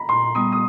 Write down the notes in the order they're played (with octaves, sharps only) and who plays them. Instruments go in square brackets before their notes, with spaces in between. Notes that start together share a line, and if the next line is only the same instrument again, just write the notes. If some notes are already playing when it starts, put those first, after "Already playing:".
Already playing: [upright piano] A#5 B5
[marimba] A#2 [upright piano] C6
[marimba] G3 B3 [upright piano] D#6
[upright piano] D#6